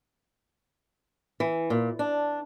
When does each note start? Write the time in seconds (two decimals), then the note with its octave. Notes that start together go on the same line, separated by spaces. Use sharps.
1.40 E3
1.70 A#2
1.99 D4